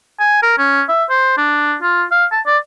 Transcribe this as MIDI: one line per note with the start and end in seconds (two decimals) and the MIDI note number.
0.20 0.38 80
0.43 0.57 70
0.58 0.83 61
0.89 1.04 76
1.10 1.33 72
1.38 1.75 62
1.82 2.04 65
2.12 2.25 77
2.32 2.41 81
2.46 2.58 74